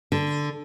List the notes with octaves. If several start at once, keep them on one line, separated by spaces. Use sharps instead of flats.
D3